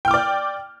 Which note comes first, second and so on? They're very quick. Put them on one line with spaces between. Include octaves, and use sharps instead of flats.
G5 F6 D6 D5